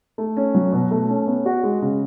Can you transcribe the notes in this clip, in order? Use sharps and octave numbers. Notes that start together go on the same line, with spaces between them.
A3
C#4
F#3
B2
A3
C#4
B3
F#4
G#3
C#3